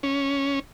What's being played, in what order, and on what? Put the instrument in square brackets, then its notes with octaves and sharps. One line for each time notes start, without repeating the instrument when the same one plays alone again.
[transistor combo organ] C#4